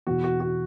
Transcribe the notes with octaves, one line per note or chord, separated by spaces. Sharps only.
E2 B2 F#4
F#4
F#4